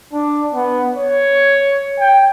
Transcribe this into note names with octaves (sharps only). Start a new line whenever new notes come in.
D4
B3
C#5
G5